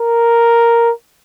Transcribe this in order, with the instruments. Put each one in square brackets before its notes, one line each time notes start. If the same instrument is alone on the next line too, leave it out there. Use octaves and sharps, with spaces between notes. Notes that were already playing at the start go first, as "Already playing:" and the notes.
Already playing: [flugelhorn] A#4